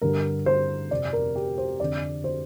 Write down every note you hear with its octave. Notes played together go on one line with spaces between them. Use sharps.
G2 D3 A#4
C5
F2 C3 D5
A#4
G4
C5
F2 D3 D5
C5